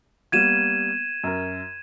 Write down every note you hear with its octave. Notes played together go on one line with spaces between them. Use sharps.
G3 A#3 B3 G#6 D#7 E7
F#2 A#4